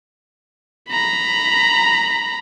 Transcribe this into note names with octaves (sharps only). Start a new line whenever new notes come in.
A#5 B5